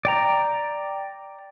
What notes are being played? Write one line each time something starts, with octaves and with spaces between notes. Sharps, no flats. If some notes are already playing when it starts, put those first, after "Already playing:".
D5 G5 A#5